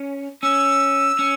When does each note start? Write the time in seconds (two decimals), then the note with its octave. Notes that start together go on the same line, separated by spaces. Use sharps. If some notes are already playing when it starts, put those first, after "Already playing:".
Already playing: C#4
0.43 C#4 E6
1.19 C#4